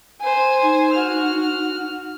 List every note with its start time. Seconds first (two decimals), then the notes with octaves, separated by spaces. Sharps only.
0.21 C5 G#5
0.63 D#4
0.93 F#4 F6